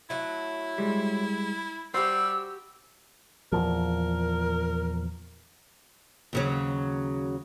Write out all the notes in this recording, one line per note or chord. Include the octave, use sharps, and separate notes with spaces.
F#3 A3 E4
G3 G#3
G3 F#4 G4 C5 E6
E2 A#2 F3 A#4
D#2 C#3 F#3